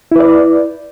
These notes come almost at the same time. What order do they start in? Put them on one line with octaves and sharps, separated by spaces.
E4 B4 D5